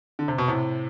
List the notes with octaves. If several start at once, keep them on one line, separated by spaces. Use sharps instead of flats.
D3
C3
B2
A2 C3